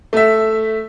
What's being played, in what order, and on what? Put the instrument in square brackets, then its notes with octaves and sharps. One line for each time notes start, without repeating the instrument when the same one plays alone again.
[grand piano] A3 E5